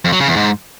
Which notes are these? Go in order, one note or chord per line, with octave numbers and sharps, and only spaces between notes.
F2
F#3
C#3
E2
G#2